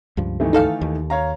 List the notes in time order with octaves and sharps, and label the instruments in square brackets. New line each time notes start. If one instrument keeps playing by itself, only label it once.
[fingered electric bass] C#2 G2 F3
[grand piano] D#3 E3 A3
[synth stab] D#4 A4 F5
[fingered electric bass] D#2
[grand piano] C#5 F5 A#5